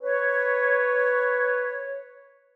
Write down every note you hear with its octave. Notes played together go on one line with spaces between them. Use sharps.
B4 C#5